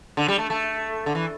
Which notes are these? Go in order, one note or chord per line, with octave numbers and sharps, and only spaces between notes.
D3
G3
A3
A3
D3
E3